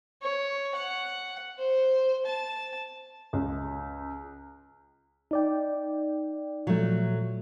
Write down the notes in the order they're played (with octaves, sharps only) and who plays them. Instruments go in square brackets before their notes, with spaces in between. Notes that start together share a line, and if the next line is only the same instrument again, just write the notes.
[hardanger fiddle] C#5
F#5
C5
A5
[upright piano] C#2
[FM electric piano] D#4 D5 G5
[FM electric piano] A#2 F3 [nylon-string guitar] F#3 A3